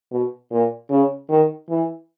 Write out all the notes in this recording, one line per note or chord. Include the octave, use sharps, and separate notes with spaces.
B2
A#2
C#3
D#3
E3